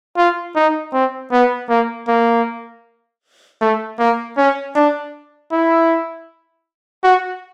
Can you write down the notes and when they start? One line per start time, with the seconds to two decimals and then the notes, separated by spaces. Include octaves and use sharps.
0.17 F4
0.56 D#4
0.93 C4
1.32 B3
1.69 A#3
2.08 A#3
3.61 A3
3.99 A#3
4.37 C#4
4.76 D4
5.52 E4
7.04 F#4